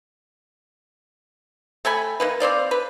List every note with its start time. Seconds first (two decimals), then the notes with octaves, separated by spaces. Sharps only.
1.85 A3 G5 G#5 B5
2.20 D#3 A#3 B4
2.40 C4 C5 D5 F5
2.71 B4